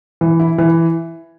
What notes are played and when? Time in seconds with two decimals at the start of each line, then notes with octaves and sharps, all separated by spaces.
0.21 E3
0.39 E4
0.58 E3